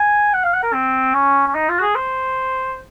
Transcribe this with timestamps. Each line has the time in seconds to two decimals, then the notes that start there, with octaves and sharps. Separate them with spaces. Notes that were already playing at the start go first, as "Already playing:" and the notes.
Already playing: G#5
0.34 F#5
0.44 F5
0.53 F#5
0.63 A#4
0.73 C4
1.14 C#4
1.47 C#4
1.55 D#4
1.69 F4
1.78 F#4
1.82 G#4
1.95 C5